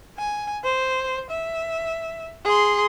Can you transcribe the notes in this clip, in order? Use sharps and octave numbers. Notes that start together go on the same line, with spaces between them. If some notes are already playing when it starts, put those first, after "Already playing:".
G#5
C5
E5
G#4 C6